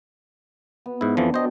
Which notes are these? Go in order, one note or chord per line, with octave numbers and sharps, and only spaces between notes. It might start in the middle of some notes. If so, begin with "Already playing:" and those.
B3
G#2 E4
F2 E3 F3 D4
B2 C5 D#5 G5 A5